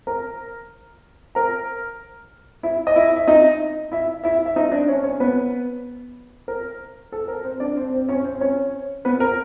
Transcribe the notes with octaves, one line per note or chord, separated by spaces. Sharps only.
A#4 A#5
A#4 A#5
E4 E5
D#5
E4 E5
E5
D#4 D#5
E4 E5
E4 E5
E5
D#4 D#5
D4 D5
C#4 C#5
C#4 C#5
B3 B4
A#4
A4
A#4
C4 C5
D4 D5
C4 C5
C4 C5
C#4 C#5
C4 C5
C#4 C#5
B3 B4
A#4